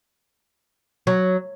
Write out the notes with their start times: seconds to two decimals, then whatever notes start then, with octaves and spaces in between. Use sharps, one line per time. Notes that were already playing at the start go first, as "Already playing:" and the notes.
1.07 F#3